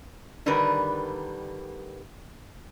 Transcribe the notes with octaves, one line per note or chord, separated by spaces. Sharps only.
D3 D#3 G3 D4 A#4 B4